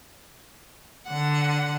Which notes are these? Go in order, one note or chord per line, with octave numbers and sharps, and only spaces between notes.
D3 F#5